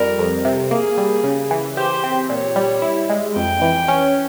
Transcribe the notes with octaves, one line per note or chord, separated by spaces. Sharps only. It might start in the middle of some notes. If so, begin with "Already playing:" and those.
Already playing: F2 G3 A#4
F2
C3
A#3 G#4
G3
C#3
E3
G4 C5
C4
A#2 C#5
G3
E4
G#3
F2 G5
E3
C#4